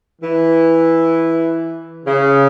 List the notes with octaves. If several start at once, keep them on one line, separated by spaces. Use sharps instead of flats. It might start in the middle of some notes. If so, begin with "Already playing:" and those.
E3
C#3